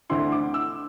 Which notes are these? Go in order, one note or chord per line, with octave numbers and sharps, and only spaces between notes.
D2 D3 C4 E4 C6
D6
E6